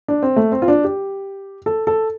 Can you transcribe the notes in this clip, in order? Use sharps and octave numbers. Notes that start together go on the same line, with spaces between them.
D4
C4
A3
C4
F4
D4
G4
A4
A4